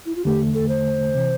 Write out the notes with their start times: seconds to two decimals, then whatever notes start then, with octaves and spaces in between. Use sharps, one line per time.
0.06 E4
0.16 F4
0.25 E2 D3 A3 G4
0.54 A4
0.69 C5
1.15 C3 E3